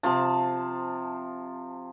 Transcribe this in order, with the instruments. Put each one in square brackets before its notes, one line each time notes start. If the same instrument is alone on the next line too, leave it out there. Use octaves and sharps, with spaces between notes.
[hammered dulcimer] C3 F3 A5